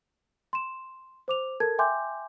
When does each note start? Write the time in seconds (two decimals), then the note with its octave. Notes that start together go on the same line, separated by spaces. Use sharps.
0.53 C6 E7
1.28 C5 D6 F7
1.60 A4 A#4 A5 G#6
1.79 E5 G5 G#5 C6 D6 G6